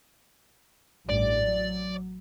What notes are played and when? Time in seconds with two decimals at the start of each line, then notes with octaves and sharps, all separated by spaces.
1.09 A1 G2 D5
1.42 F#3